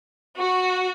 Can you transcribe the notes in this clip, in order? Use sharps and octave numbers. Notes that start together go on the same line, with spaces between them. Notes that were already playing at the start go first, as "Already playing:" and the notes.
F#4